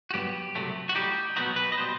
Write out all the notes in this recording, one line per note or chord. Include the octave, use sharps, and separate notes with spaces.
F#4
G2 F#3 B3 G4
C2 C3 F#3 A3
F#4
A2 G3 D#4 G4
B2 F#3 B3 D#4 F#4
B4
D#5
B2 G3 C5